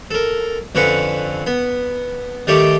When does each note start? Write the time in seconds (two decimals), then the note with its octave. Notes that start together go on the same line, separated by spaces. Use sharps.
0.11 A4 A#4
0.75 F2 D3 C4 C#4 B4 C#6
1.47 B3
2.47 D#3 G3 A3 G4 C#5 D6